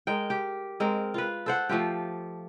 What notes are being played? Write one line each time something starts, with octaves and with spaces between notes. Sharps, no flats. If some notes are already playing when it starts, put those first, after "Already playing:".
G#3 A#4 G5
G4
G#3 C4 A#4
F4 B4
A4 C5 F#5
F3 A3 F4 G4